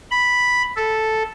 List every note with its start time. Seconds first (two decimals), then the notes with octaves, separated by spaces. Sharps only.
0.11 B5
0.76 A4